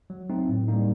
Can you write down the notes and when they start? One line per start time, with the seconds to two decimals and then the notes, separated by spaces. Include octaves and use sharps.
0.10 F#3
0.30 A3 C4 D#4
0.49 A2
0.68 G3 A#3 D#4